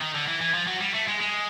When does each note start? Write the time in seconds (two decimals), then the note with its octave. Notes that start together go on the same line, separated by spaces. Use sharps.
0.01 D#3
0.15 D3
0.28 E3
0.41 E3
0.54 F3
0.67 F#3
0.81 G3
0.95 A3
1.08 G#3
1.21 G#3